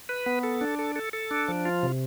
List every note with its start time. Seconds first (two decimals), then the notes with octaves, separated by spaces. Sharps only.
0.09 B4
0.26 B3
0.43 A4
0.61 D4
0.79 A4
0.96 A4
1.13 A4
1.31 D4
1.48 F3
1.65 F4
1.83 C3